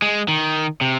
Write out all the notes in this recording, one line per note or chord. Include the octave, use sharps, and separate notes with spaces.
G#3
D#3
C3